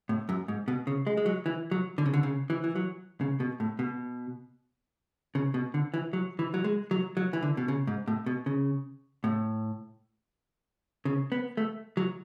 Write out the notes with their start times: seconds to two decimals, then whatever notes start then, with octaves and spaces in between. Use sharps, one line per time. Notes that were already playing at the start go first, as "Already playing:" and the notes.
0.09 A2
0.29 F#2
0.48 G#2
0.68 B2
0.87 C#3
1.07 G#3
1.17 G#3
1.26 F#3
1.46 E3
1.71 F#3
1.98 D3
2.06 C#3
2.14 D3
2.23 C#3
2.50 E3
2.64 E3
2.76 F#3
3.21 C#3
3.40 B2
3.60 A2
3.79 B2
5.35 C#3
5.54 B2
5.74 D3
5.94 E3
6.13 F#3
6.39 E3
6.54 F#3
6.64 G#3
6.91 F#3
7.17 F#3
7.33 E3
7.42 D3
7.57 B2
7.68 C#3
7.87 G#2
8.08 A2
8.26 B2
8.46 C#3
9.24 A2
11.05 C#3
11.32 B3
11.57 A3
11.97 F#3